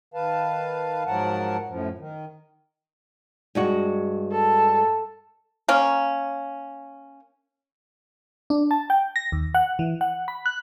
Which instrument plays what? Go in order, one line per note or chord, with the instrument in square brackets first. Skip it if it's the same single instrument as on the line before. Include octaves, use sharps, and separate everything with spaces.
[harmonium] D#3 B4 F5 A5
G#2 F3 F#3 A#4 F#5 A5
F#2 A2 F3
D#3
[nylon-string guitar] G2 G#3 F#4
[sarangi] A4
[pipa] A#3 C#4
[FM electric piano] D4
A5
G5
A#6
D#2
F#5
E3
F#5
B5
F#6